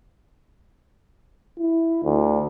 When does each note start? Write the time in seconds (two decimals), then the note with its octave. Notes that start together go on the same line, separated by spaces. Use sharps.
1.59 E4
2.04 D2